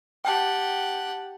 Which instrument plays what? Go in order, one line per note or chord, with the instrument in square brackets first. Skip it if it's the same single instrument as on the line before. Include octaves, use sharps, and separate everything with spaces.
[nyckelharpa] G4 F#5 [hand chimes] G5 A5